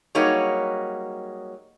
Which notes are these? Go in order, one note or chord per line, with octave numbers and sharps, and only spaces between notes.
F#3 G3 A#3 D#4 G#4 C#5